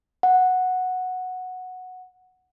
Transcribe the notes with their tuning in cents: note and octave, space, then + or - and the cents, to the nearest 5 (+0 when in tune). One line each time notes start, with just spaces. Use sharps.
F#5 -5